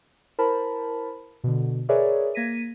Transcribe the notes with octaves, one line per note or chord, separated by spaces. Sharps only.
E4 A#4 C5 A5 B5
B2 D3
G#4 A#4 B4 C#5 D5 E5
A#3 G#6 A#6 B6 D#7